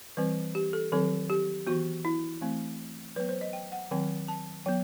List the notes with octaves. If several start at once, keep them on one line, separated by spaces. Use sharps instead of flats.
E3 G3 C4 B4
G4
A4
D#3 F#3 C4 A4
G4
E3 B3 F#4
E4
E3 A3 C4
F#3 B3 B4
C5
D#5
G5
F#5
D#3 F#3 C4 G5
A5
F#3 B3 G5